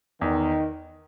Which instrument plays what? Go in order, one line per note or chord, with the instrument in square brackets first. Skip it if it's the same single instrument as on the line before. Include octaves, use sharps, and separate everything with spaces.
[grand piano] E2 [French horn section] D#3